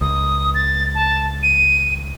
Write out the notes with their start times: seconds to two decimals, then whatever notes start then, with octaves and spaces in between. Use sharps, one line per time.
0.01 C#2 D#6
0.55 A6
0.95 A5
1.43 D#7